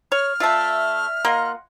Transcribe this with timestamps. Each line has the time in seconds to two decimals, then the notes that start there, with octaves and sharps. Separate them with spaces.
0.12 C#5 F6
0.40 A3 F4 D5 E5 A5
1.25 A#3 F4 D#5 F#5